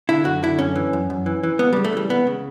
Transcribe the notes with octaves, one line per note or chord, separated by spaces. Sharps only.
D3 E4
F#2 F#4
D3 E4
F#2 C#4
E3
F#2
F#2
E3
E3
C#2 B3
C#3 G3
A3
E3 G3
C#2 B3
C#3